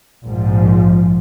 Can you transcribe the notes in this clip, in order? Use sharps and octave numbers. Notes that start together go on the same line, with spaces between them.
A#1 G#2 F3